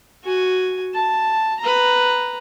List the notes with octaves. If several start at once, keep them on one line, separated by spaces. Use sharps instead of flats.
F#4 G#5
A5
B4 A#5